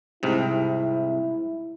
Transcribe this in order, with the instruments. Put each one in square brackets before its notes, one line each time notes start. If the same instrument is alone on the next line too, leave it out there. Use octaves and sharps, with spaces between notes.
[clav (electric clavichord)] C2 G#2 C3 [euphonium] E4